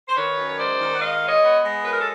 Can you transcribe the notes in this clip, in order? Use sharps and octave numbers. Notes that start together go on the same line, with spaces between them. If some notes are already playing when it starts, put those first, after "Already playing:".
C5
D#3 B4 C#5
F#2
C#5
G#3 C5 D5
D#3
F#5
G#3 D#5 F5
G#3
C#5 D#5
B3
G#3
F#2 B4
A#4
A4